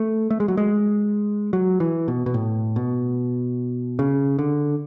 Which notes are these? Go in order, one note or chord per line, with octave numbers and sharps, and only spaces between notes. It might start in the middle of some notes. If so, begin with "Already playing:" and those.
Already playing: A3
A3
G#3
F#3
G#3
F#3
E3
B2
B2
A2
B2
C#3
D3